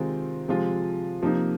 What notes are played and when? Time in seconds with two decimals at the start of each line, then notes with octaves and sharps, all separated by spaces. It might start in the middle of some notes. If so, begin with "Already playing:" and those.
Already playing: C3 D#3 G#3 C4 F4
0.48 C3 F3 G#3 F4
1.22 C3 F3 A#3 D#4